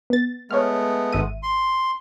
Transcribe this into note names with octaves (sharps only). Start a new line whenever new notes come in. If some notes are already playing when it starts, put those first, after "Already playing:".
B3 A6
G#3 A3 B3 C#5 F6
G#1 E5 D#7
C6